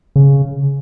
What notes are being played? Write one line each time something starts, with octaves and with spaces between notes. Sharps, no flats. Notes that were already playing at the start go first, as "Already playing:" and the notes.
C#3